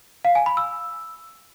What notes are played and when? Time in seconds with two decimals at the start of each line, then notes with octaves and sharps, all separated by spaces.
0.25 F5
0.35 G#5
0.46 B5
0.57 E6